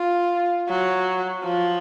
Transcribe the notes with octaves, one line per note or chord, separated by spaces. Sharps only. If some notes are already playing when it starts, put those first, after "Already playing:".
Already playing: F4
F#3
F3